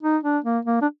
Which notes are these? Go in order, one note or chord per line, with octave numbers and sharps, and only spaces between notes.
D#4
D4
A#3
A#3
D4